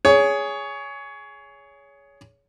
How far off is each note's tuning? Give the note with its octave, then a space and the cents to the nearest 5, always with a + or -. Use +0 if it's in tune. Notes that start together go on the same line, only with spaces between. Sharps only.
G#4 +0 C#5 +20